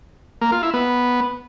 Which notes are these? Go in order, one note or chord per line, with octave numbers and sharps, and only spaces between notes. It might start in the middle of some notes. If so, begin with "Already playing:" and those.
A#3
F4
E4
B3